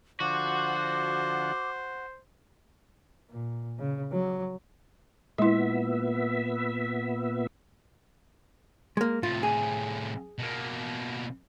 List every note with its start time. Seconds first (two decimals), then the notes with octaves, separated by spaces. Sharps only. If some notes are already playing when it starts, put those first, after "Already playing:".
0.20 D3 F3 F#4 C5 F#5 D6
3.30 A#2
3.79 C#3
4.12 F#3
5.38 A#2 G#3 B3 E4 E5
8.97 G#3 A#3
9.23 A2 C3 F4
9.43 G#4
10.39 B2 A#3